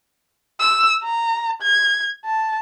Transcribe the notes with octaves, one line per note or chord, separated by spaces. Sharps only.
E6
A#5
G#6
A5